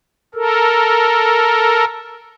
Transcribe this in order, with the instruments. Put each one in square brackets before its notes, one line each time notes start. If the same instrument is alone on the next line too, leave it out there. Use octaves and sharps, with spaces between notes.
[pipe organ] A4 A#4